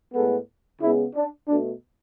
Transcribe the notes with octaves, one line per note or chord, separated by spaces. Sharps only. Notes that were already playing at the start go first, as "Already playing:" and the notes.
A2 G#3 B3 A4
C#3 G#3 B3 E4
D4
B2 A3 D4